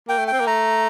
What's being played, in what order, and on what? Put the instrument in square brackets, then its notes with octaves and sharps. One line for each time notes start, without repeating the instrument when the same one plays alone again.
[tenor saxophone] A#3 [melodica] G5
[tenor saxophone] A3
[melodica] G5
[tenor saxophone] C4
A#3
[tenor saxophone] A3 [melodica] A#5